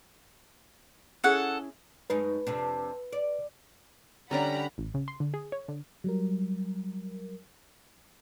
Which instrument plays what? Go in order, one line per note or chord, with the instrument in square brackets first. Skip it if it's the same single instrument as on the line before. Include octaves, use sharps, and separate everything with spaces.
[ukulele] C#4 E4 G#4 [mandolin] A4 F#5
[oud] F#2 G#3 D#4 [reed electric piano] B4
[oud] F2 C3 D4
D5
[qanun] D3 C#4 D4 [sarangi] G3 [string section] F#5 A#5 B5
[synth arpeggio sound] A1
C#3
C6
D3
G#4
C#5
D3
[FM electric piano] F#3 G3 A#4